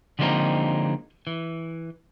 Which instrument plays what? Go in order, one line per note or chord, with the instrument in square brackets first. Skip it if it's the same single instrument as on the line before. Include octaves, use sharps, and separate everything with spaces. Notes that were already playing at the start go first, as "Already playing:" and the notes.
[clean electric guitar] D3 F3 G#3 A#3 C4 D#4
E3